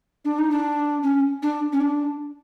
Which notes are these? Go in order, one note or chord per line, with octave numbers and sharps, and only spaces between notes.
D4
D#4
D4
C#4
D4
C#4
D4